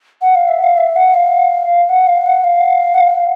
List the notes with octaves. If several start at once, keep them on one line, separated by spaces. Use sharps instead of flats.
F#5
F5
E5
F5
E5
F#5
F5
F#5
F5
F#5
F5
F#5
F5